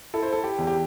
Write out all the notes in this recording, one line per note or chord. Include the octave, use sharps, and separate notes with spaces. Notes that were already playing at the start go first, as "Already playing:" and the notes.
E4 A4
C5
A4
G4
E2
G4